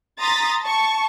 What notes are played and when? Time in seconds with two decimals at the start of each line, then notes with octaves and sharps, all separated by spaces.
0.19 A#5 C6 D#6 A6 B6
0.62 A5 C#6